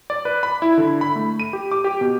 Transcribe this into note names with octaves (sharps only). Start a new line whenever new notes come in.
D5
B4
B5
E4
D3
B5
A3
D#7
G4
D6
G4
B2